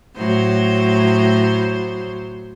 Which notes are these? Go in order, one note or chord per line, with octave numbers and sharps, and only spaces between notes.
A2 F#3 C5